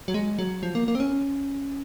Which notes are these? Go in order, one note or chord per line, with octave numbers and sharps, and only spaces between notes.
F#3
G#3
F#3
F3
A#3
A#3
C4
C#4